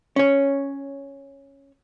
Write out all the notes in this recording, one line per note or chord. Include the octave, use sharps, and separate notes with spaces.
C#4 C#5